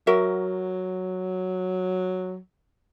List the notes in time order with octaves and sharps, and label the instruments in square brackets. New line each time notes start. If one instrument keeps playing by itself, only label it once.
[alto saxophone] F#3 [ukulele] F#4 A#4 E5